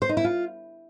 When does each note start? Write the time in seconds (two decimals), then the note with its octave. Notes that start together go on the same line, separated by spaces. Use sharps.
0.02 C5
0.09 D#4
0.17 E4
0.24 F4